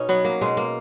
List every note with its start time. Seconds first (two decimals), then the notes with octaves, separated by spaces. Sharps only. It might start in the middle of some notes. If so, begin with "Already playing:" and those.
Already playing: B2 C#4 D#4
0.09 F#3 B3
0.25 A#3
0.41 B2 G#3
0.57 A#3